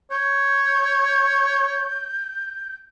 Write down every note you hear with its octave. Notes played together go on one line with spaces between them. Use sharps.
C#5 G6